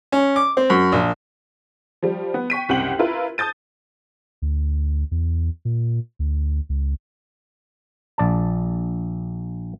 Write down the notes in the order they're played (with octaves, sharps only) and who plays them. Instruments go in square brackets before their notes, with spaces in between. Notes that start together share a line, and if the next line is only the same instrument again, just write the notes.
[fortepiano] C#4
D6
C4
F#2
A#1
[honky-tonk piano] F3 G3
B3
G5 C#6 B6 D#7
F#1 C2 F#5 G5 F#7
E4 F4 A#4 B4
A5 D#6 G6 A6 D#7
[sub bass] D2
E2
A#2
D2
C#2
[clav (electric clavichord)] A#1 D5 A5